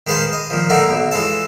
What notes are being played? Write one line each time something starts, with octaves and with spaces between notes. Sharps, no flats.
D#3 G#3 B4 C5 F5 A5
D#5
A#2 D#3 F3
D3 G3 A3 A#3 D#4 F#4
B1 B2
E3 G#3 F4 A4 A5